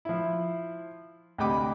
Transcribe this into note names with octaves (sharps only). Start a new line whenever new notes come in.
F3 E4
D2 C3 D#5 G5 B5 D6